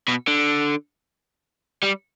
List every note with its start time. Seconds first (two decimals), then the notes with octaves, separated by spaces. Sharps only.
0.08 B2
0.28 D3
1.83 G3